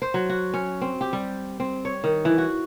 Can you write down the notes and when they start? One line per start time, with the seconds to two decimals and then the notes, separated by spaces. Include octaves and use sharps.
0.02 C5
0.14 F#3
0.29 F#4
0.54 C#4
0.81 C4
1.01 G4
1.13 G3
1.60 C4
1.85 C#5
2.04 D#3
2.25 E3
2.38 F#4